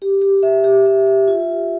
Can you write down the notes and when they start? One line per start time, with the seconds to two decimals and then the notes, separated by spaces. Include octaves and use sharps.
0.02 G4
0.22 G4
0.43 E5
0.64 G4
0.86 E5
1.07 E5
1.28 F4